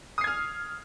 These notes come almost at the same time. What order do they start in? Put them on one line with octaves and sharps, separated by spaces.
D#6 C7 G#6 F6